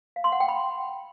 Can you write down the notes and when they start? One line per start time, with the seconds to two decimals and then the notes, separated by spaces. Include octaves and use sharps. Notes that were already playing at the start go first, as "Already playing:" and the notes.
0.16 F5
0.24 C6
0.32 F#5
0.40 G5
0.48 B5